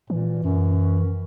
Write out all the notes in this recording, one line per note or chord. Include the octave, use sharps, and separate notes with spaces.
A#2 E3
F#2